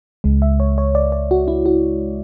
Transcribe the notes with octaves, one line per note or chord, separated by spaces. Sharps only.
C#2 C#3 G#3
E5
C#5
C#5
D5
D5
F#4
E4
F#4